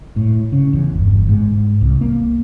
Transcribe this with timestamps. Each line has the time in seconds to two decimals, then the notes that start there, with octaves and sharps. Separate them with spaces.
0.16 A2
0.52 C#3
0.73 E2
0.95 G1
1.29 G#2
1.81 C2
2.01 A#3